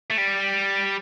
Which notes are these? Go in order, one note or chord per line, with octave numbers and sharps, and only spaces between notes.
A3
G3